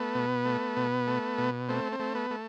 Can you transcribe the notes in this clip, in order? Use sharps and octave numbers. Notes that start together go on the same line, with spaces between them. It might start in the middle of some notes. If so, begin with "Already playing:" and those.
Already playing: A3 B3
B2
A3
B2
A3
B2
A3 C4
C4
A3
B3
A3